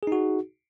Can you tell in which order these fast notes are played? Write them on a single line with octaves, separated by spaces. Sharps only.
G#4 D#4 F#4